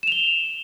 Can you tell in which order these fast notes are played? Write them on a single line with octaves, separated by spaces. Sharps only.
E7 F7 G7